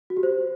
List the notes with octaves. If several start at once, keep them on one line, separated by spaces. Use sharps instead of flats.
F#4
G4
C5